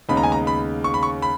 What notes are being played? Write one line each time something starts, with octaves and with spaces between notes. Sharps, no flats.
D#2 C#3 G#3 B3 D#4 B5
A#5
G#5
A#5
B5
C#6
B5
C#6
B5